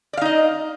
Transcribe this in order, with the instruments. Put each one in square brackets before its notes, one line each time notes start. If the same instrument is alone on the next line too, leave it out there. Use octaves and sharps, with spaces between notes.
[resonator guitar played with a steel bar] D5
F5
D#4
D#5